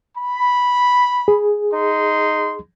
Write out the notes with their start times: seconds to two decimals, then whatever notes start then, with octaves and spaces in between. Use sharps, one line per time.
0.16 B5
1.28 G#4
1.73 D#4 C6